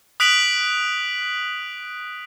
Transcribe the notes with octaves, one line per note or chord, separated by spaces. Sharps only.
D#6 F#6 B6 D7 F7 F#7